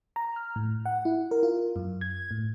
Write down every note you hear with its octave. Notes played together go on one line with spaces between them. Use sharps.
A#5
F6
A2
F#5
E4
A#4
F4
F#2
G#6
A2